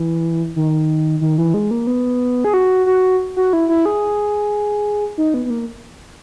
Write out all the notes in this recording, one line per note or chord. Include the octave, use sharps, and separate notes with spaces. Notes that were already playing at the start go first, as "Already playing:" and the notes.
Already playing: E3
D#3
D#3
E3
G#3
A#3
B3
G#4
F#4
F#4
F#4
E4
E4
G#4
D#4
B3
B3
A#3